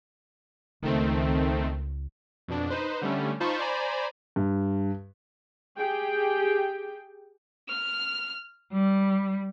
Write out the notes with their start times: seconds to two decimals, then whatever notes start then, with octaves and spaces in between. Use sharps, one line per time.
0.83 C#2 D#3 A3 C4
2.48 F2 B2 D4
2.70 D#4 B4 C5
3.02 D3 G3 A3 C#4
3.40 D#4 F4 C5 A5 B5 C#6
3.58 C5 D5 G#5 A#5 B5
4.36 G2
5.78 G4 G#4 G5
7.68 F6
8.72 G3